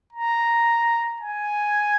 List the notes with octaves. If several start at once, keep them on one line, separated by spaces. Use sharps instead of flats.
A#5
G#5